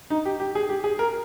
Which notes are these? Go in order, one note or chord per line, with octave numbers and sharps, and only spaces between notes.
D#4
G4
G4
G#4
G4
G#4
A#4